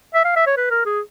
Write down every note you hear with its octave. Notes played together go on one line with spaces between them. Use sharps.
E5
F5
E5
C#5
B4
A#4
G#4